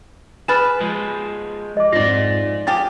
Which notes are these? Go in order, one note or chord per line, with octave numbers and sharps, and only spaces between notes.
G#4 B4 F6 A6 E7
F3 G#3
D#5 D6
F2 G#2 F4 D5 A#6
F3 G4 G#4 A6